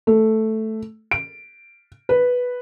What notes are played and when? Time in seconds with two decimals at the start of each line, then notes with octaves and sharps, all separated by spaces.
0.07 A3
1.11 D7
2.09 B4